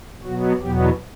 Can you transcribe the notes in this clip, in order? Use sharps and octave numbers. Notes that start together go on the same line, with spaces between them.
B2 F#3 B3 F#4
E2 B2 F#3 B3 G4